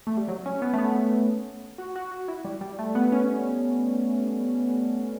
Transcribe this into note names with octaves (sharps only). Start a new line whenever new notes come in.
A3
G3
F#3
C#4
B3
A3
B3
F#4
F#4
F#4
E4
G3
G3
A3
B3
C#4